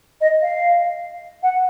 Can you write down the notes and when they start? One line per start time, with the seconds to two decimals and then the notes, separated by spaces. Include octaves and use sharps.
0.21 D#5
0.42 F5
1.43 F#5